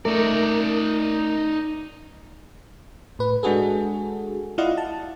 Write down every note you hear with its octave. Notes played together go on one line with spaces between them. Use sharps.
A3 D#4 A#4 D5
A2 B4
G#3 D4 F#4 G#4 A4
E4 F4 D5 D#5 F5 F#5
A5